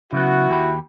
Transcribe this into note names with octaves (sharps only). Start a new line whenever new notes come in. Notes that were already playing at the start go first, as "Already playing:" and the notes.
C#3 F#3 B3 E4 F#4
D#2 G4 B5